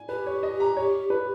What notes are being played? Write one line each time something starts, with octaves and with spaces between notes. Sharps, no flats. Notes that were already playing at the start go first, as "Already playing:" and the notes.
Already playing: G#5
G4 B4
C#5
D#5
A#5
C#5
B4